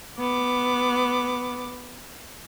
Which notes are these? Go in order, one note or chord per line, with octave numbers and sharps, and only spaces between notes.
B3 D6